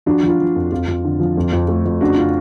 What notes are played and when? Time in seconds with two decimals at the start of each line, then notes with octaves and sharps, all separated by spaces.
0.06 F3 D4 F#4
0.23 F3
0.28 F4
0.40 F3
0.55 F2
0.71 F2 F4
0.87 F2
1.04 D3
1.20 F3
1.37 F2
1.52 F2
1.68 A3
1.85 F2
2.01 C#3 D4 F#4
2.18 C#3 F4